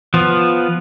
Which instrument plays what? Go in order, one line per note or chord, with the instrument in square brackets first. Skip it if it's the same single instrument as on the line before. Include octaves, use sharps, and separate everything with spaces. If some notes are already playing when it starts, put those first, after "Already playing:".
[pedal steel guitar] F3 B3